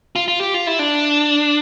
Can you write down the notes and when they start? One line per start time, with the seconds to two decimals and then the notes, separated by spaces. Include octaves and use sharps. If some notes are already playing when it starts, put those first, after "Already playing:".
0.16 F4
0.28 F4
0.41 G4
0.54 F4
0.67 E4
0.79 D4